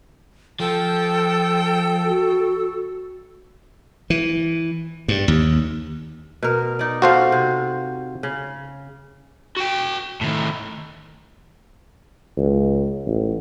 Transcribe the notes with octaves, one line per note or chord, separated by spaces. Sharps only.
F3 A4 G5
F#4
E3
G2
D#2
B2 A#4
D#4 D5
F4 F#4 A4 C5 F5
C3
C#3
F#4 G5
A2 D#3
C#2
A1